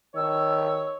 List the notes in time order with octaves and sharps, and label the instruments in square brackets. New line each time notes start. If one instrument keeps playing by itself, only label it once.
[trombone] D#3 [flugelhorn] C#5 [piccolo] E6